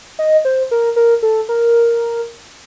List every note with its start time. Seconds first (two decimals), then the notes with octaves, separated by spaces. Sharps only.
0.19 D#5
0.45 C5
0.71 A#4
0.96 A#4
1.23 A4
1.49 A#4